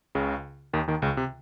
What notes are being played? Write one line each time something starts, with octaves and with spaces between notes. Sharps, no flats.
C#2 C#3
D#2 D#3
D#2 D#3
C#2 C#3
C3